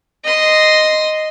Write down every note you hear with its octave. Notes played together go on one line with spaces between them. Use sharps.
D#5 C6